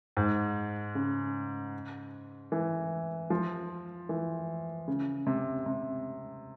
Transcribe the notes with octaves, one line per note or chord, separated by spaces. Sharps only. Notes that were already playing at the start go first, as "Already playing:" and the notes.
G#2
C#3
E3
F3
E3
C#3
C3
C3